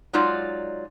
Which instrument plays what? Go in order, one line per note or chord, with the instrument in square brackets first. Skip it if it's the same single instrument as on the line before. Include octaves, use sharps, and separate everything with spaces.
[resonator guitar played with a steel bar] F#3 G#3 D#4 F4 D5